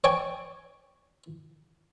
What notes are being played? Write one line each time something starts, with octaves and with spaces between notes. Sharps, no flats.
C#5 D5 G5 G#5